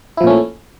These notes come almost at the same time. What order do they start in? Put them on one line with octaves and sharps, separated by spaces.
E4 F3 A#2 C#4 A3